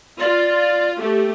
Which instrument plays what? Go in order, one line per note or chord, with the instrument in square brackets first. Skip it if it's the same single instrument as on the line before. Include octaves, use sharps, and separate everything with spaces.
[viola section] F4 [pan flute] D5
[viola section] A3 G4